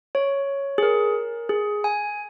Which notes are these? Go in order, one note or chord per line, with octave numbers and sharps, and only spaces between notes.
C#5
G#4
A#4
G#4
G#5